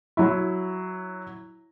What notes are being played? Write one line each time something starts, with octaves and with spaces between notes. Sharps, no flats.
F#3 E4